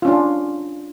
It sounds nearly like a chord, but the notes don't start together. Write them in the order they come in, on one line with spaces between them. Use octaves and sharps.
F4 C#4 D4